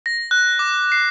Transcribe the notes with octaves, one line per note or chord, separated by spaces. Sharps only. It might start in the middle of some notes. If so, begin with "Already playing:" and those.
A#6
F#6
D6
C7